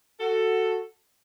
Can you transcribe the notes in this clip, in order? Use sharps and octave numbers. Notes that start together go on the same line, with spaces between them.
F#4 A4